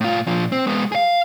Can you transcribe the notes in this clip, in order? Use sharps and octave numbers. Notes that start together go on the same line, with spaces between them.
A2 F4
A#2 F3
C4
G#3 B3
G#4 F5